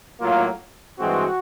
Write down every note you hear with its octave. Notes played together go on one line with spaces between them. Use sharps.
A2 F#3 A#3 F4
G2 E3 G#3 C4 F#4